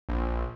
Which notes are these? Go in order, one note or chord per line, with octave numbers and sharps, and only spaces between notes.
A#1